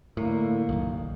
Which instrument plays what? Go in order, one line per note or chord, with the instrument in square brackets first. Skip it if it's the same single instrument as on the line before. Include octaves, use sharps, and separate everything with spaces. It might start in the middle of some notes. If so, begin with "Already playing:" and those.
[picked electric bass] A2 [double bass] D3 A#3
[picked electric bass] F#1 B1 [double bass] D#3